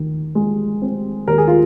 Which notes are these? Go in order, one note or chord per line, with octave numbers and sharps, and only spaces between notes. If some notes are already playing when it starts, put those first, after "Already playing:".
Already playing: D#2 D#3
G#3
C4
D#2 A#4
G#4
F4